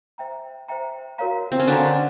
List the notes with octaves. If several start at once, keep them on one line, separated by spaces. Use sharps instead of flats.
C5 E5 G5 A#5
C5 E5 G5 A#5
F#4 A#4 C#5 F5 A#5
C4
C#4
D3 D4 F#4 A#4 C#5 F5 A#5